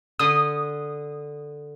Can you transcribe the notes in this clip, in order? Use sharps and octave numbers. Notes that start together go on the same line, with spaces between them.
D3 D#6